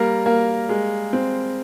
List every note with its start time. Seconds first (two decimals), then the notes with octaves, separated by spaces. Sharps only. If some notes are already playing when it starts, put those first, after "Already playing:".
Already playing: G3 A#3 A#4
0.26 A#3
0.69 G#3
1.13 C4